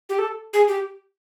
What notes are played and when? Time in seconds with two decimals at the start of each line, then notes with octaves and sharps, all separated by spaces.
0.09 G4
0.19 A4
0.53 G#4
0.68 G4